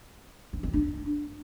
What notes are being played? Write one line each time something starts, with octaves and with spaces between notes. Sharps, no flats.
C#4
C4
D4